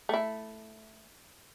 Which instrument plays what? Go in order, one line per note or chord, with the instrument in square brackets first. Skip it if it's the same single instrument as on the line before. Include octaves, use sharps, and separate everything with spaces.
[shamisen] A3 E4